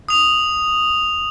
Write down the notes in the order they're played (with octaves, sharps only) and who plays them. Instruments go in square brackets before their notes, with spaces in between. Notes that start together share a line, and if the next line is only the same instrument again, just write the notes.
[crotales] D#6 F7